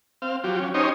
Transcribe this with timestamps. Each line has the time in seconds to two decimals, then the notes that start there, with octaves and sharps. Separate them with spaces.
0.22 C4 F5
0.44 F#3 F4 G4
0.60 C#4
0.74 C#4 D#4 G4 C5 C#5 D#5